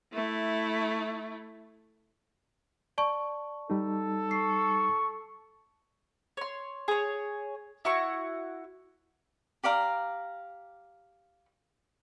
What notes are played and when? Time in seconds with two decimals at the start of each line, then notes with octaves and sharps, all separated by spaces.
0.13 A3 E4
2.98 D5 A5 C#6
3.70 G3 D#4 A4
4.31 C#6 C7
6.37 C#5 C6
6.88 G#4 C#5
7.85 E4 F#4 C#6
9.63 G4 D5 F5 A#5